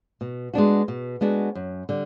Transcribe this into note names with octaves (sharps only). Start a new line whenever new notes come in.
B2
G#3 B3 D4 F#4
B2
G#3 B3 D4 F#4
F#2
D3 G3